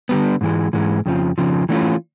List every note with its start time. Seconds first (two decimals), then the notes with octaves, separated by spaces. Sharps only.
0.09 D3 G3 B3
0.41 G#2 E3 G#3
0.73 G#2 E3 G#3
1.06 F2 C#3 F3
1.38 F2 C#3 F3
1.69 E3 A3 C#4 F4